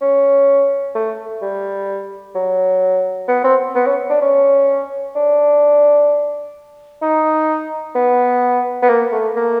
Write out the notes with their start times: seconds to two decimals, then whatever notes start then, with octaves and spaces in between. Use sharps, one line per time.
0.01 C#4
0.95 A3
1.42 G3
2.35 F#3
3.28 B3
3.44 C4
3.75 B3
3.86 C#4
4.10 D4
4.22 C#4
5.15 D4
7.02 D#4
7.96 B3
8.82 B3
8.89 A#3
9.12 A3
9.36 A#3